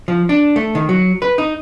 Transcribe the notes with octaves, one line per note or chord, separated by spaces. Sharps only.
F3
D4
A3
D#3
F#3
B4
D#4